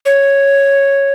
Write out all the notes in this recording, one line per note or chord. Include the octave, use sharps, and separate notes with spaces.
C#5